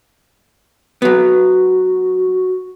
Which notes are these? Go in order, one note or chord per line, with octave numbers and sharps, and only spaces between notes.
F#3 B3 F#4